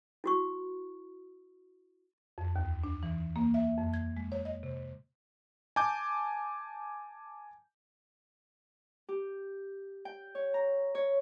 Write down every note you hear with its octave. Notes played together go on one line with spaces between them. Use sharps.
E4 F#4 C#6
F2
D#2
D4
E3
A#3
E5
F2
G#6
G#3
C#5
D#5
C3
G#5 A5 D6 G6
G4
G5
C#5
A#5
C#5